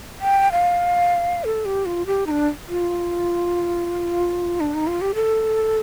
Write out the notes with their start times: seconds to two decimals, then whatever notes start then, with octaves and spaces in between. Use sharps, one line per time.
0.21 G5
0.52 F5
1.44 A4
1.65 G4
1.86 F4
2.06 G4
2.27 D#4
2.31 D4
2.69 F4
4.60 D4
4.74 D#4
4.87 F4
5.01 G4
5.15 A4